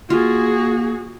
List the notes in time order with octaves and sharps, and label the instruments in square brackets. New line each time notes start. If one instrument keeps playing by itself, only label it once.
[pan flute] A#3 [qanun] F4 [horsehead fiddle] F#4 G#4